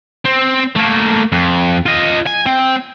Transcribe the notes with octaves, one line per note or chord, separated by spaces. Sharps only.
C4
A3 A#3
F2
F4 D#5
G#5
C4